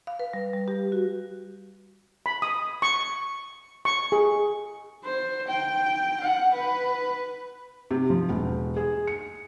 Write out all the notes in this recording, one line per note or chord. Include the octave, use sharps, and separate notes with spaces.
F5
B4
G3
G3
G4
F#4
B5
D#6
C#6
C#6
G#4
C5
G5
F#5
B4
C3
F3
E1
G#4
C#7